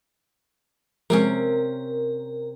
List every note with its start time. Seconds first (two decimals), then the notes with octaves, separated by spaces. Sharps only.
1.10 C3 F3 G#3 C4 C#4 G#4 A#4